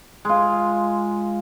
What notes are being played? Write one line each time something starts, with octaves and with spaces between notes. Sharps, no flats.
G#3 F4